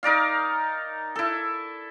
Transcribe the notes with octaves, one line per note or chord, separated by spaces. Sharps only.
D#4 A#4 D5 F5
E4 A4